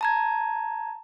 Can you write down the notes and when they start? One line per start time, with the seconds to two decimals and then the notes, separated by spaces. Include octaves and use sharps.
0.01 A5 A#5 G#6